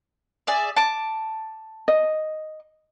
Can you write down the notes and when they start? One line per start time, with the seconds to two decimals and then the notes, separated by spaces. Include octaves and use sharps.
0.47 G#4 D5 E5
0.77 A5 D6
1.88 D#5